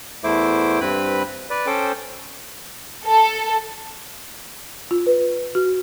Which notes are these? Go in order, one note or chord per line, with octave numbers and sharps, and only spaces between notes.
E2 A3 E4 C5 D6
G2 C4 B4 B5
B4 D5
C#4 A4 C5 G5 D6
A4
F4
B4
F#4